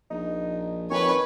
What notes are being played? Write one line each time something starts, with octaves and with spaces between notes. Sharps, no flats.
A#1 D#4
F2 D#3 B4 C#5 G#5 C#6